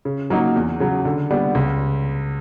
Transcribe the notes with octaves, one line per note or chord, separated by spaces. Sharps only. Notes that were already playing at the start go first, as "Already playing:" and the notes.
C#3
F#3 A#3 D#4
E2
C#3 F#3
D3
G3 B3 D4
C#2